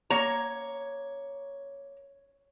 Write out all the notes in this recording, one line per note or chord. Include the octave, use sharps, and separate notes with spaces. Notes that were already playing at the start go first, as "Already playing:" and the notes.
A#3 C#5 A#5